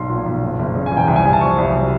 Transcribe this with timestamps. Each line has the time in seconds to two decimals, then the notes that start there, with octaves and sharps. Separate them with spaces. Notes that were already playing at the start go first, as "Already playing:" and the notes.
Already playing: B1 F#3 C6
0.10 A#2
0.26 B1
0.43 F#1
0.59 F#1
0.75 C#3
0.86 G#5
0.92 E2
0.97 G5
1.08 C2 G5
1.16 G#5
1.25 C2
1.33 A5
1.41 F3 C#6
1.58 C2
1.74 F#3